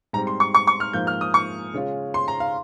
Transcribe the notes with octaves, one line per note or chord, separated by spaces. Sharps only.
G#2 G3 C4 A#5
C6
C#6
C#6
C#6
F6
G#2 F3 A#3 F4 G6
F6
D#6
C#6
C#3 G#3 C#4 F4
C6
A#5
F5